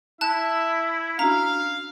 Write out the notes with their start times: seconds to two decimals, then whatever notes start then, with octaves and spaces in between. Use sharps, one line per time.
0.21 E4 E5 A5 F#6
1.19 C#4 D4 F#4 F5 A#5